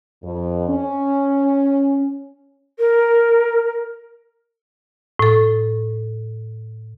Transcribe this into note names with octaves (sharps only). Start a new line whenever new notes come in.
F2
C#4
A#4
A2 A4